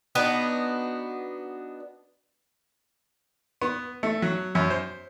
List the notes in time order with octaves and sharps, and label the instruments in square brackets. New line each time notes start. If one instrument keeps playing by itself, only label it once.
[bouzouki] B3 D4 D#4 F#4
[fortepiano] B3
A3
F#3
F#2
C5